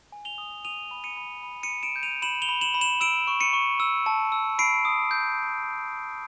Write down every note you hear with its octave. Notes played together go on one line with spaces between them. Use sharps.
G#5
F7 G7
D#6
D#6 D#7 F7
B5
C#7 D#7
B5
B5
C#7 D#7
B5
D7 E7
G6
D#7 F7
B5 E7 F#7
F7 G7
B5
E7 F#7
B5
E7 F#7
E6 D7 E7
C#6
C#7 D#7
C#6
E6
A5
E6
B5 C7 D7
D#6
G6